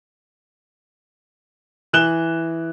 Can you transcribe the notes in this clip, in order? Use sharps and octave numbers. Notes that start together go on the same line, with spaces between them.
E3 F#6 E7 G7